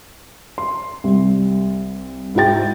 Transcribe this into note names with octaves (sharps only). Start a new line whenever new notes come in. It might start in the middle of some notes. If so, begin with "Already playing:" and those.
C6
C2
G#2 E4 F#4 G5 A6